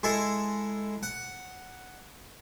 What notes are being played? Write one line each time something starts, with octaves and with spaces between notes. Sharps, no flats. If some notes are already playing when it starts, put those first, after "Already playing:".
G#3 E4 G#4 A4 E5
F#5